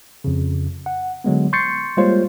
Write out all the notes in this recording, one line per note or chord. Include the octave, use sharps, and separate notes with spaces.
F2 C#3
F#5
D3 F#3 G#3 B3
C6 C#6 G6 A6 C7 C#7
G3 G#3 A#3 F4 C5 C#5